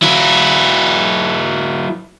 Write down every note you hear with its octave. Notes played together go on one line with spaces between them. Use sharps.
F#3 E4